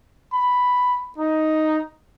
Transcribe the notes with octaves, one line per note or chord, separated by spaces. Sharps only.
B5
D#4